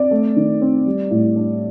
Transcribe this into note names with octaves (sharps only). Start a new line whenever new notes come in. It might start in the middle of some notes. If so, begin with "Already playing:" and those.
Already playing: C4 D5
A3
D#3
C4
G3
A2
D4